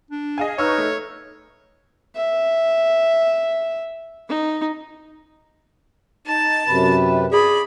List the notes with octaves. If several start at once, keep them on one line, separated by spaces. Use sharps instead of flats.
D4
G#4 D#5 F5 G#5
D#4 B4 C#5 C#6 E6 F6
A3
E5
D#4
D#4 A5 A6
F#2 C3 B4
G#4 D5 B5